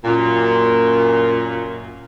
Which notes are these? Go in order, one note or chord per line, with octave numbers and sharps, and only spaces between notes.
F#2 A#2